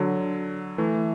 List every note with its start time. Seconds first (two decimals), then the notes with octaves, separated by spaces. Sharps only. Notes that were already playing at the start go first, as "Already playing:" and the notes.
Already playing: D3 F#3
0.78 E3 A3